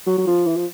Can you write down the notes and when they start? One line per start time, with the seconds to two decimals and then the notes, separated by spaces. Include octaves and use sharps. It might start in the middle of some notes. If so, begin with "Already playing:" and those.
0.06 F#3
0.18 F#3
0.27 F3
0.46 E3
0.56 F3